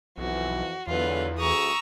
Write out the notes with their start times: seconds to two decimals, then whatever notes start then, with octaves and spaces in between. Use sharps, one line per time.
0.18 B1 F2 E3 F#4
0.87 E2 D3 E3 F#3 F4 B4
1.39 D2 G#4 A#5 C#6 D#6 E6